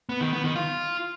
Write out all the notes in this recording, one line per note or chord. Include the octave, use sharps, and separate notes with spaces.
B3
D#3
B3
D#3
F4